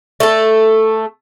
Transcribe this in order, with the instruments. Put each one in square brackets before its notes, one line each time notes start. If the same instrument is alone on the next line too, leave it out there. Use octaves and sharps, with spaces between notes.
[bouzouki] A3 A4